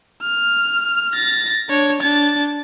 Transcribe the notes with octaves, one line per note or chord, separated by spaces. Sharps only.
F6
A6 A#6
D4 C#5
D4 A6